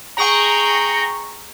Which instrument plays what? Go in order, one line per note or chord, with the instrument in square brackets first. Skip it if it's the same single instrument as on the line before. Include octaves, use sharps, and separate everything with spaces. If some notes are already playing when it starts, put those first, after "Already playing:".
[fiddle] G#4 G5 [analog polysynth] A#5 C#6